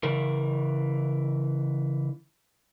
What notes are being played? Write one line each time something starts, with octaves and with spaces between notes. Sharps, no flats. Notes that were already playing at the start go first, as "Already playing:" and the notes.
C#3 E3 A#4